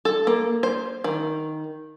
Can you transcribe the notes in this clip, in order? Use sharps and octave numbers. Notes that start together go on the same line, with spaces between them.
A4
A#3
C5
D#3